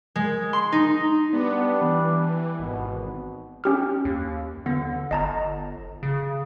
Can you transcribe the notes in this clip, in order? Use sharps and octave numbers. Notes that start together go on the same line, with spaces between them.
G#3
C6
D#4
G3 B3 D4
E3
G#1 B2
C#4 G4 F6
D#2
D3 B3
G1 D#5 A5 A#5
C#3